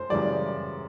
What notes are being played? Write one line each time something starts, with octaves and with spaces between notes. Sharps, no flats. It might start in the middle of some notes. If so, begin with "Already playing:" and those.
Already playing: F#2 C5
F#2 C#3 E3 G3 D5